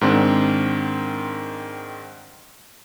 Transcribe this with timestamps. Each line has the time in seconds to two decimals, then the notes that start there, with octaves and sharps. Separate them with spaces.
0.01 G#2 D#3 C4 D4